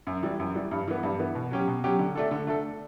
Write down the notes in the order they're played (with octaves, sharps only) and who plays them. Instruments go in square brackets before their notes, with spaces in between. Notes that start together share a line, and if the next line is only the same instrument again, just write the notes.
[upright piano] F#2
E3 G3
F#2
E3 G3
G2
E3 B3
G2
E3 B3
B2
F#3 C#4 G4
B2
F#3 C#4 G4
D3
A3 D4 A4
D3
A3 D4 A4